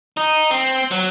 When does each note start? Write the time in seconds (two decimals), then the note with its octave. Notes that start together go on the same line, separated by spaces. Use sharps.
0.17 D#4
0.51 C4
0.91 F#3